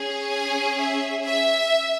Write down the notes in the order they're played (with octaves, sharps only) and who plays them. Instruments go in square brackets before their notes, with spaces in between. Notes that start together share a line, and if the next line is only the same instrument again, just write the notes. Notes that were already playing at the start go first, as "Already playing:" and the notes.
Already playing: [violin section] C#4 G#4
G#5
E5
E5